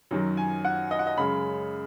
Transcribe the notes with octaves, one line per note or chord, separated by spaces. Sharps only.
F#2 D#3 F#3
G#5
F#5
D#5
F#5
D#5
F#2 C#3 G#3 B5